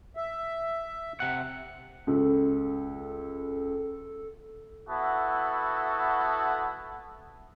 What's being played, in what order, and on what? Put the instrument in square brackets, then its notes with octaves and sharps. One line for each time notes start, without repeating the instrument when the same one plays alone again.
[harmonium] E5
[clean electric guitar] C3 F#5
[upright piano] C#2 [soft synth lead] A4
[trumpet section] B3 E4 F#4 A4